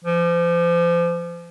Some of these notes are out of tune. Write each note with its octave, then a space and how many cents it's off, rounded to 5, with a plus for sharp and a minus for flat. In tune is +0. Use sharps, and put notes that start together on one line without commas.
F3 -35